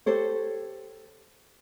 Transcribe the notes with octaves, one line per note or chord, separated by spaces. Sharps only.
G4 A4 C5 C#5